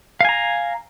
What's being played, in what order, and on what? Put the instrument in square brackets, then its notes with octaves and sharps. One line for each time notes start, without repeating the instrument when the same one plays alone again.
[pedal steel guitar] F5
G#5
A#5